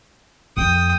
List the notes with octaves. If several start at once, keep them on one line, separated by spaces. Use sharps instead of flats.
F2 G5 D#6